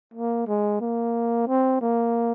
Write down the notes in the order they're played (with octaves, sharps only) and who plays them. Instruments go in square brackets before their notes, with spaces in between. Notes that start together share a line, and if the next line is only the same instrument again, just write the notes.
[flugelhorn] A#3
G#3
A#3
C4
A#3